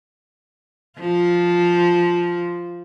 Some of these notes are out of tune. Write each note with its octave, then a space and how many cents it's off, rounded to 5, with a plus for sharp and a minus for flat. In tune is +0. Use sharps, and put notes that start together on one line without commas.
F3 +0 F4 +0